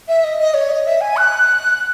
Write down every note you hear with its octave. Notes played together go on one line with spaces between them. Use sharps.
E5
D#5
D#5
C#5
D#5
E5
G#5
F#6